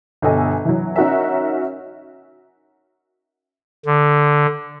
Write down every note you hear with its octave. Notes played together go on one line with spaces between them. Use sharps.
G1 B2 A4 D#5 G#5
E3 F#3
C#4 D#4 F#4 A#4 E5
D3